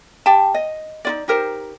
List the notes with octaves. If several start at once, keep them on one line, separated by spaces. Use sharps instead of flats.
G4 G5 A5
D#5
D#4 F4 D5
D#4 G4 A#4 C5